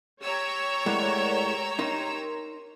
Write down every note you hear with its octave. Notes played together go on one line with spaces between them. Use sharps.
G4 C#5 A#5 E6
A2 G#3 A#4 D5 F#5
D#4 A#4 C6